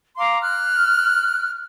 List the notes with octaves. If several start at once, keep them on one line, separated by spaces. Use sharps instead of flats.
F5 A#5 C6 D6
F6 F#6